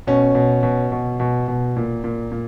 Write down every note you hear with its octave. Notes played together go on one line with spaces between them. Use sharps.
B2 C#4
B2
B2
B2
B2
B2
A#2
A#2
A#2